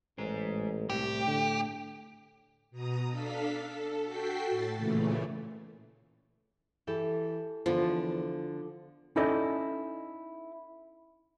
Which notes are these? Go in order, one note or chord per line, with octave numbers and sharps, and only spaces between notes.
A1 G#3 C5
C2 A2 G4
D3
B2 A#5 D#6
D4 A4 F5 B6
A4
F#4 A4 G5 B6 C7
A2 A6
A#2 C#3 E3 A3
E3 G4 A4
E2 D3 F3
C#4 D#4 E4 A4 D5 D#5